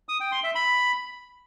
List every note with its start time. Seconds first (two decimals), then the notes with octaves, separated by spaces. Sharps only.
0.09 D#6
0.20 G5
0.32 C6
0.44 E5
0.55 B5